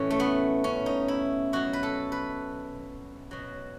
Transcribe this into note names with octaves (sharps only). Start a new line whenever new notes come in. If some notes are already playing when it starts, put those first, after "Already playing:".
Already playing: A2 E3 C#4
A3
B3
C#4
D#4
E4
B2 F#3 F#4
B4
A4
B4
B2 F#3